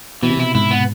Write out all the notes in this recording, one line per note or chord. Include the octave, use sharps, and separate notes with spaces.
B2 E3
C3
B2 E4
G#2 E4
B3